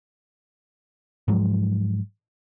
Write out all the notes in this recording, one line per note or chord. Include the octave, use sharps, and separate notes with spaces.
G#2 F3 F#3 G#3